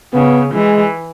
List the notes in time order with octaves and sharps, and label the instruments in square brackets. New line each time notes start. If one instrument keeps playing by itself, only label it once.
[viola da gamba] C#3 [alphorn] B3
[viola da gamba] E3 [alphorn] G#3